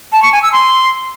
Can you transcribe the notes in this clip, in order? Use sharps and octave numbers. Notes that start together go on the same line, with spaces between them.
A5
C#6
G#5
E6
C6